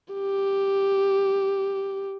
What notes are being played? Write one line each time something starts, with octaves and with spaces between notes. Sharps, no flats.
G4